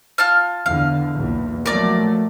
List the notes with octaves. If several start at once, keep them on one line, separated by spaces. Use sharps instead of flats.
F4 A5 F6
E2 D3 F5
B1 E2 A#2
F3 F#3 A3 A#4 D5